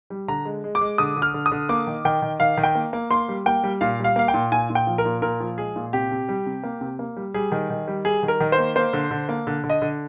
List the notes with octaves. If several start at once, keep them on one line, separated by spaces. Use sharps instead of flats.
G3
D3 A#5
G#3
G#3
D6
G#3
D3 D#6
D3
F6
D3
D#6
D3
A#3 D6
D#3
D#3 G5
D#3
D#3 F5
D#3
G5
A#3
A#3
A#3 C6
G3
A#3 G5
G3
A#2 F5
G3
F5
A#3 F5
G5
A#2
A#2 G#5
A#2
G5
F3
A#4
A#2
A#2 A#4
F3
G#3 G#4
A#2
C3 G4
C3
G3
C3
A#3
C3
A#3
G3
G3 G#4
D#3
D#3
G3
G3 G#4
D#3
A#4
D#3
C5
A#3
A#3 C5
D3
D3
A#3
D3
D3
D#5
D3